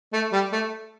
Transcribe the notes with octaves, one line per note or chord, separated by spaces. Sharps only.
A3
G3
A3